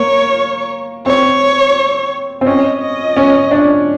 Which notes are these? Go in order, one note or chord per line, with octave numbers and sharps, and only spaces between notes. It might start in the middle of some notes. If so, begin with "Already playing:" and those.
Already playing: A#3 C#5
C4 C#5
C4
C#4 D#5
D#5
C#4
D4